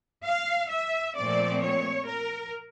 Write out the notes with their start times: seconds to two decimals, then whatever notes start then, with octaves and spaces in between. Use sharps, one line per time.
0.24 F5
0.70 E5
1.16 A#2 F3 A3 C4 D5
1.62 C#5
2.07 A#4